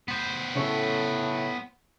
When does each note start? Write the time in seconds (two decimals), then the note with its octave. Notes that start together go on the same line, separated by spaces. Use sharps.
0.08 B3 C5
0.55 A2 C#3 C#4 A4